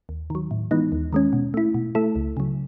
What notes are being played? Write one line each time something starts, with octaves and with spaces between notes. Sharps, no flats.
D#2
D#3 F#3
A2
E3 G#3 B3 D#4
D#2
D#3 G#3 C#4
B2
A3 E4
B2
A3 E4 A4
C#2
C#3 F#3